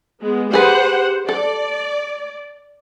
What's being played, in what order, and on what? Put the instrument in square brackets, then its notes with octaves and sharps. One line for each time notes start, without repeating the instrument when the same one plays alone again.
[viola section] G#3 B3
[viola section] G4 C5 F#5 [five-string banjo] G#4 B4
[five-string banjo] A4 [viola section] D5